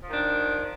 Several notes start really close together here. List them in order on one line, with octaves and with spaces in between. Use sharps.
F3 D#3 D4